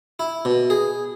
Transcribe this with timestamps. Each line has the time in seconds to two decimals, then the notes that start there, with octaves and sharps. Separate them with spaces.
0.19 E4
0.45 B2
0.70 G#4